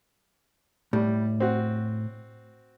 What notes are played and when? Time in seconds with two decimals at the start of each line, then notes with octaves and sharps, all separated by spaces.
0.93 A2 G3
1.40 C4 F#4